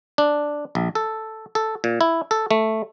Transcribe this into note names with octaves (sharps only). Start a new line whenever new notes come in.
D4
A#1
A4
A4
A#2
E4
A4
A3